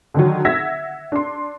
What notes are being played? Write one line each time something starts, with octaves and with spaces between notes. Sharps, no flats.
D3 D#3 F#3
E5 F#5 E6 G#6 A#6 B6
D4 C6